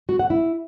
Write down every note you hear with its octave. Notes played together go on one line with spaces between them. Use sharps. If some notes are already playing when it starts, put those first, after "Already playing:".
F#4
F#5
E4